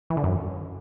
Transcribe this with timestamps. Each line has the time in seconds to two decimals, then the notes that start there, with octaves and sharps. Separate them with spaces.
0.10 E3
0.17 D3
0.24 F#2